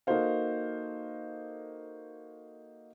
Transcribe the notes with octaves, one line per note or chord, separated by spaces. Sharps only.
A#3 D#4 F#4 A4 C5 F5